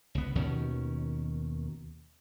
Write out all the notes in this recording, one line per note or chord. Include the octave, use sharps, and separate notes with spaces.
C#2 B3
D#2 B2 D#3 C#4